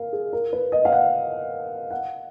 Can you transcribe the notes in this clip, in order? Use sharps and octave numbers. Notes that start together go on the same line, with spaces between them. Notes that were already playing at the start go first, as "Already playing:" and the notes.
Already playing: A#4 F5
G#4
A#4
B4
D#5
F5
F#5
F#5